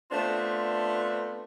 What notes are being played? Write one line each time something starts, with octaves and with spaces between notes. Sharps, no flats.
A3 B3 C4 D4 F4